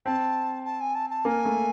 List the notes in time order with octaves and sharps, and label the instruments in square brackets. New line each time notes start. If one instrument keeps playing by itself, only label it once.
[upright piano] C4 [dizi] A5
[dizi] A5
G#5
A5
A5
[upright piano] A#3 [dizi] G#5
[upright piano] A3